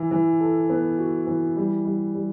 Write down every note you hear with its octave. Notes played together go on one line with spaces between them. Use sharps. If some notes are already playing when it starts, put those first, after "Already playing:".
Already playing: E3
E3
A4
B3
F#4
E3
G3
G3
G3